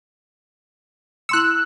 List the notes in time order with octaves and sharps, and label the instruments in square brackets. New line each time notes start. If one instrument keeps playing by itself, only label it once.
[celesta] E4 C6 C#7 [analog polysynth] E6 F#6